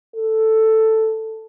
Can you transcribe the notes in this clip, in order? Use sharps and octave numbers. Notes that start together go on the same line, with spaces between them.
A4